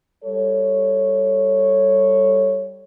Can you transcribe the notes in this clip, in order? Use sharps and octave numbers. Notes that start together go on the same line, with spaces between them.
G3 A4 C#5